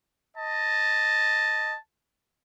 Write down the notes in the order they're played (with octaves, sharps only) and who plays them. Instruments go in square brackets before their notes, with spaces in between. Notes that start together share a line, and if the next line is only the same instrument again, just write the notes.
[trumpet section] D#5 A5